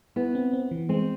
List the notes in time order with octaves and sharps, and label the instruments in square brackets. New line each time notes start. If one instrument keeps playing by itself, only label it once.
[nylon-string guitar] B3 [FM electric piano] E4
[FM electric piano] C4
C4
E3
[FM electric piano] G#3 [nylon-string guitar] C4